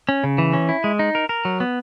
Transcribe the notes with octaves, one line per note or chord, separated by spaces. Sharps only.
C#4
C#3
E3
C#4
E4
G#3
D#4
A#4
A#4
F#3
B3